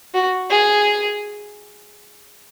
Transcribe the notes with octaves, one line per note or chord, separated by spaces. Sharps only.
F#4
G#4